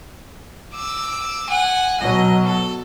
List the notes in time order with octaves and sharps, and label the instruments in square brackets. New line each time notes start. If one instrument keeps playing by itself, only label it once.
[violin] D6 E6
F#5 G#5
[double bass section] B2 F#3 [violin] D#5
[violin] A4